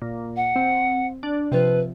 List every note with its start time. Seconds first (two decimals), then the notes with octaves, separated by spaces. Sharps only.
0.02 A#2
0.36 F#5
0.56 C4
1.23 D4
1.52 C3 F3 B4